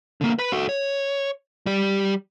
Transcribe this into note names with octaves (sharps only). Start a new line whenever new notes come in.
D3 A#3
B4 B5
F#4 A4
C#5
G3 G4